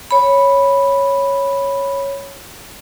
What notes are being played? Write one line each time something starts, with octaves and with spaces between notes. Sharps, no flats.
C#5 B5